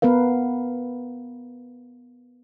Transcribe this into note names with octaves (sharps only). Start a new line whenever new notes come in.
B3 A#4 B4 F5